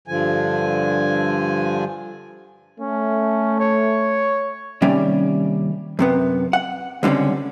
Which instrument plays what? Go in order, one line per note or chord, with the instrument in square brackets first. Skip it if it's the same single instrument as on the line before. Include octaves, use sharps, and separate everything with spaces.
[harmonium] G2 D3 F3 G#5
[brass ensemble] A3 [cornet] C#4
[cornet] C#5
[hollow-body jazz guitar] D#2 C3 G3 C#4 D5
F#2 C3 B3
F#5
C#2 D3 G3 C4 C#4